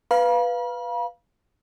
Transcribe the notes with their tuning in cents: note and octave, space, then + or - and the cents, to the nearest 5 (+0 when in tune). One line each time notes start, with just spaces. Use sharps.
B4 +0 F5 +0 B5 -45